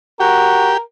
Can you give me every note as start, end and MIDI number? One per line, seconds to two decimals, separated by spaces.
0.20 0.72 66
0.20 0.77 67
0.20 0.80 70